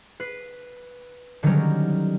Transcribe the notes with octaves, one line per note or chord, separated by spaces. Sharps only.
B4 C7
D3 D#3 F#3 G3 C#4 A#4